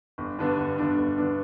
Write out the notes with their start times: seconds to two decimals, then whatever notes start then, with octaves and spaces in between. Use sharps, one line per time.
0.18 G1
0.39 G2 D3 B3 D4
0.58 G1
0.78 G2 D3 B3 D4
0.98 G1
1.18 D3 B3 D4